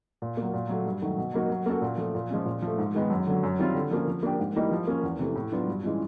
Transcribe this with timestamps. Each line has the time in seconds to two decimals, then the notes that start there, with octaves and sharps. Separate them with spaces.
0.22 A#2
0.37 A#3
0.42 F#3
0.53 A#2
0.69 F#3 A3
0.86 G2
1.02 D#3 F#3 A3
1.17 B2
1.34 F#3 A#3 D#4 F#4
1.49 F#3
1.66 A#3 C#4 F#4 A4
1.82 A#2
1.98 F3 A3
2.15 A#2
2.30 F3 G#3 C#4
2.46 A#2
2.62 F3 A3
2.78 G#2
2.95 D#3 G#3 B3
3.10 F#2
3.27 D3 F#3
3.43 F#2
3.59 D#3 G3 C4 F4
3.75 D3
3.91 F3 A#3 C#4
4.08 F3
4.23 A#3 D4 G4
4.39 G#2
4.56 E3 G3 A#3 D#4
4.71 F3
4.87 A#3 C#4
5.03 E2
5.19 C3 E3 A3
5.35 A2
5.52 F#3 B3 D4 F4
5.68 G2
5.83 E3 G#3 C#4 F4